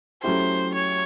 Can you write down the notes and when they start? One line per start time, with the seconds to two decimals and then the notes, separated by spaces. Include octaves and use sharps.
0.22 F#3 A3 C#4 E4 G4 C5
0.74 C#5